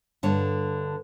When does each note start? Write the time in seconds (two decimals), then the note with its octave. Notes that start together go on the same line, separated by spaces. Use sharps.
0.23 G2 D3 C#5